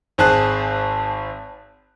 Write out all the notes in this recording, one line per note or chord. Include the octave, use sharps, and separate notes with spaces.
G#1 C4 G#4 A5 F#6